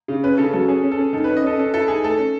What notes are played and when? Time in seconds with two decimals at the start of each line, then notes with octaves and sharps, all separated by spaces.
0.08 C#3
0.24 C#4 B4
0.38 C#3 A4
0.53 F#3 A4
0.68 C#4 G#4
0.84 C#4
0.92 A4
0.98 C#4
1.13 D#3 A4
1.24 B4
1.28 C#4
1.37 D#5
1.43 C#4 A4
1.58 C#4 A4
1.73 E4 A4
1.88 D#3 G#4
2.04 A3 A4
2.18 C#4